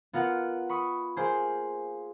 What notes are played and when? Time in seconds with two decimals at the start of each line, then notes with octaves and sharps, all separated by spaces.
0.13 B3 F4 A#4 F#5
0.69 B5 C#6 D#6
1.16 A#3 G#4 C5